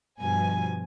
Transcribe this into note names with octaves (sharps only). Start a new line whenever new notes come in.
G2 B2 F3 G#5